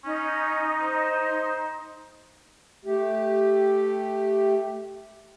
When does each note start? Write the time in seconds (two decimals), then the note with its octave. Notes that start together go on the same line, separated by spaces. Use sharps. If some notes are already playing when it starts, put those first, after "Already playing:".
0.04 C#4 D#4
0.81 C5
2.85 A3 G4